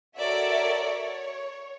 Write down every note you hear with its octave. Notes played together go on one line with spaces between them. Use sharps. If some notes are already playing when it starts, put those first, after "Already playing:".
F#4 A4 A#4 C#5 D5 E5
C#5